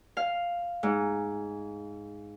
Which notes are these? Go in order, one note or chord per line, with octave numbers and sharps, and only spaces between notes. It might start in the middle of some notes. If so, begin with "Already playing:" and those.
F5
G#2